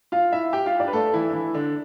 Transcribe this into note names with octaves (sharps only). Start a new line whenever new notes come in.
F4 F5
E4 E5
G4 G5
F4 F5
D4 D5
B4
A3 A4
E3 E4
D4
E3 E4
D3 D4